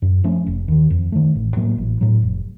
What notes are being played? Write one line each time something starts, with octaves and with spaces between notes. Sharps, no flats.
F#2
F3 A3 C#4
F1
D#2 D#3
F2
D#3 A3
A1
A2 F#3 A#3
A1
A2 F#3
F1